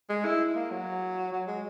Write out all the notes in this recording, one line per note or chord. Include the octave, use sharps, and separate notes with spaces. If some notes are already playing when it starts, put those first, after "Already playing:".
G#3
E4
A#3
F#3
F#3
G#3